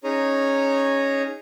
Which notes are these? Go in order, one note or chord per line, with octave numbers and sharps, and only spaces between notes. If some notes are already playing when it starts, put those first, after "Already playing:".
C#4 D#4 G#4 C#5 G#5 A#5